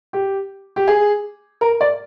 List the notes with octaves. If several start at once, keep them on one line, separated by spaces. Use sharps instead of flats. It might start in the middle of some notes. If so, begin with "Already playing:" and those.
G4
G4
G#4
A#4
D5